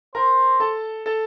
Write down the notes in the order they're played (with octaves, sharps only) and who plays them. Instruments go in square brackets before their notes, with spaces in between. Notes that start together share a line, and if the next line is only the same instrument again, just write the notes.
[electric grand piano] A#4 A#5 [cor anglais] C5
[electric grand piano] A4 A5
A4 A5